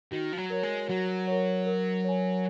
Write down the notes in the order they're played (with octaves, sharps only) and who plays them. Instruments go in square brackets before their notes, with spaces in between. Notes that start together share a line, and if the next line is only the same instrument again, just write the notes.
[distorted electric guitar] D#3 [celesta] F#4
[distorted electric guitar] F3
F#3
[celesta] A#4 C#5
[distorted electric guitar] G#3
[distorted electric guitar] F#3 [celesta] F#4
[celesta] A#4 C#5
A#4
C#5 G#5